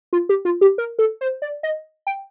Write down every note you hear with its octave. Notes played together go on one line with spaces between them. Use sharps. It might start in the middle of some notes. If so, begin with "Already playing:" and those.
F4
G4
F4
G4
A#4
A4
C5
D5
D#5
G5